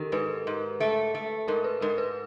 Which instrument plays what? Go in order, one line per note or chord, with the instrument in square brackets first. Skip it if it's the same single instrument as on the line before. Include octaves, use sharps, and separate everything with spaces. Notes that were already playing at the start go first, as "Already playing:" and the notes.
Already playing: [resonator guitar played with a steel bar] D#3 [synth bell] G4 A4 A#4
[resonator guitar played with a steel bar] G#2 [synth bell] B4
[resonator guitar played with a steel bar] G#2
A3
A3
[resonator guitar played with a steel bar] G#2 [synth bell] A#4
[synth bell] B4
[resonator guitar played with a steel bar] G#2 [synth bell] A#4
[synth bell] B4